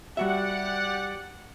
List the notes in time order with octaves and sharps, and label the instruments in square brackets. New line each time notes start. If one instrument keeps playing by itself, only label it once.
[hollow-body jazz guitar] G3 F#4 E5 [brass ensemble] G4 D5 F#5